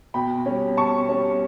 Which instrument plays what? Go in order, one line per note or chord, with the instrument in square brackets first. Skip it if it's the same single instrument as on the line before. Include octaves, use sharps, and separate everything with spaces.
[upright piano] B2 G5 B5
G3 C#4
B2 A5 C#6
G3 C#4